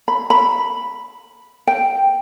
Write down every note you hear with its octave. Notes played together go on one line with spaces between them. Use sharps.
B5
B5
G5